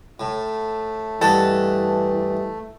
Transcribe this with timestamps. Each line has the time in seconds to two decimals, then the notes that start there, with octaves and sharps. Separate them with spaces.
0.20 A2 A3
1.21 G2 E3 A4 D#5 F#5